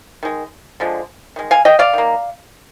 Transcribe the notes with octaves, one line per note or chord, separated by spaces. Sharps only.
D#3 G#3
D3 F3 G#3
D#3 G#3
F5 G#5
D#5 G5
D5 F5
D#3 A#3